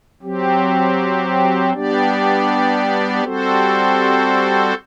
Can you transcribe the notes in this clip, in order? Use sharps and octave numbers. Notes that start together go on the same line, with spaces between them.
F#3 C4 G4
G3 B3 D4 G4 D5
G3 C4 F#4 A4 C5